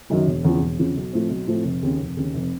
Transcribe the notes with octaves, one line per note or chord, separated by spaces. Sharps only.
F#2 D#3 F#3
E1
E2 C#3 F3
E1
E2 C#3 F3
B1
A2 F3 A3 C4
B1
A2 F3 A3 C4
F1
D#2 C#3
F1
D#2 C#3
F1